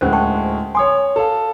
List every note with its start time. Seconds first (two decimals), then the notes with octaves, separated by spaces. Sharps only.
0.01 D2 A2 G#3 C#4 A#4 C5
0.13 G5 A5 C#6
0.75 C#5 G#5 C6 D#6
1.16 A4 F5